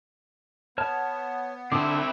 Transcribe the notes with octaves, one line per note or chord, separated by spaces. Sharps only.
B3 C#5 A5 F6
D3 C4 D4 E4 D6